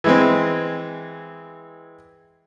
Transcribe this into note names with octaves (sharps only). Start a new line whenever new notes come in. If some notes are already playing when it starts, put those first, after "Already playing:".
E3 G#3 C4